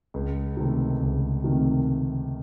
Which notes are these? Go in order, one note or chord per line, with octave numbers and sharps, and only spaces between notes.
C#2
C3 D#3 A3 C4
C#2
C3 D#3 A3 C4